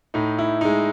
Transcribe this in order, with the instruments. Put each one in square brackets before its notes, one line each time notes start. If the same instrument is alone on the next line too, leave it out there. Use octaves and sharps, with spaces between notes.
[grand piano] A2 D#4
E4
G#3 D#4